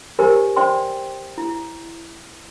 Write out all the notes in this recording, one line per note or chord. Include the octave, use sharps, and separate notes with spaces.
G4 A#4 C5 C#5 G#5
C5 D5 G5 C6
E4